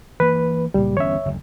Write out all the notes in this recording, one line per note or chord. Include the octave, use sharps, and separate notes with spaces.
E3 A#3 B4
C#2 A#2 G3
G1 E2 C#4 C#5 E5
F#1 D2